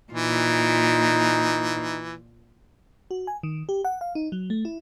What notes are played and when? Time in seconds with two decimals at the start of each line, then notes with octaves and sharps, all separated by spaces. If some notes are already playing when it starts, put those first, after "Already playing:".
0.12 A#2 E3 D#4 F4
3.11 F#4
3.27 G#5
3.43 D#3
3.69 G4
3.85 F#5
4.01 F5
4.15 D#4
4.32 F#3
4.50 A3
4.65 E4